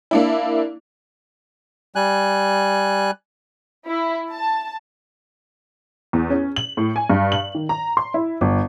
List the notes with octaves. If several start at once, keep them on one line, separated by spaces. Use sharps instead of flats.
A#3 D4 E4
G3 G#5 F#6
E4
A5
E2
C#4
F#7
A2
G#5
G2
F#7
D#3
A#5
C6
E4
G1